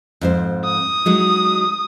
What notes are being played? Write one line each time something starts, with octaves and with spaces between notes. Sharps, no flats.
F2 G#2 C5
D#6
F#3 G#3 D#4